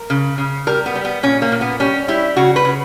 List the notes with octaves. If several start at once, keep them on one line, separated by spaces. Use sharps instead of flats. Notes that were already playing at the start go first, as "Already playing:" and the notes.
Already playing: A#4
C#3
C#3
G3 A#4
B3
G3
B3
A#2 C#4
A#3
A#2
B3
G3 C#4
G3 E4
C#3 F#4
B4
C#3